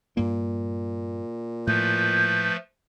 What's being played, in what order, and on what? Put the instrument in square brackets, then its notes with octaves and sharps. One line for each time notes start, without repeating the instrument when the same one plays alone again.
[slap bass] G2 A#3 [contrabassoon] A#2
[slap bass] A2 [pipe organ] F3 A3 B4 [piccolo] G6